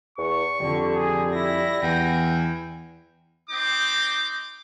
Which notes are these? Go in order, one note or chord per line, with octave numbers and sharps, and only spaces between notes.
E2 C#6
F2 D3 G3
G#4
E4 A#6
E2 G5
C4 D#4 D6